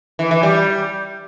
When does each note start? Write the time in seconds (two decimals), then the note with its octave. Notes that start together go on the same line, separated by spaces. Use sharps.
0.19 E3
0.31 E3
0.43 G3